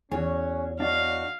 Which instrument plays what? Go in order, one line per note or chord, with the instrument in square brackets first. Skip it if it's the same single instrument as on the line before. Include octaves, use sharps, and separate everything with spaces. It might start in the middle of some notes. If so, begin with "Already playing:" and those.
[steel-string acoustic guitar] E2 C#5 [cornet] C#4 [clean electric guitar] F#4 G#4
[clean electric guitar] D4 D5 D#5 [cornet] F#4 [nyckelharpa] F5